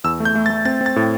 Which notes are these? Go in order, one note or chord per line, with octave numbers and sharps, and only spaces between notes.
E2 E6
A3
G6
A3
A6
A3
C4 A6
C4
A6
A2